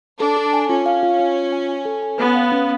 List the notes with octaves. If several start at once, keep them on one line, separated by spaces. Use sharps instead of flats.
D4 A4
A4
G#5
C#4 F4
F5
F4
F4
F4
G#5
G#5
A4
G#5
B3 B4
F5
C#4